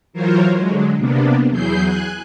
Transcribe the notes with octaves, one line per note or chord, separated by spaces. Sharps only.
E3 F#3 F4 A#4 C5 C#5
D3 F#3 G#3
C3 A#3 B3 D4
E2 F#3 E4 G#4 G6 C7
G#5 F#6